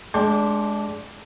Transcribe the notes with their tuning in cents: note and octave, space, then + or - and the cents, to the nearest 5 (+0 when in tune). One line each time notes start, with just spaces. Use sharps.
G#3 +20 D4 -15 G4 +20